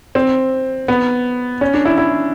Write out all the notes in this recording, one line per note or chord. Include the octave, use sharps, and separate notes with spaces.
C4
B3
C#4
D4
E4
E4